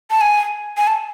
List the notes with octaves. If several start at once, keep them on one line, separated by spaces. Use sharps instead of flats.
A5
G#5
G#5
A5